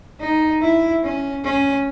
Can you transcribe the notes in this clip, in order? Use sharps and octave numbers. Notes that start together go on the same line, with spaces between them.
D#4
E4
C#4
C#4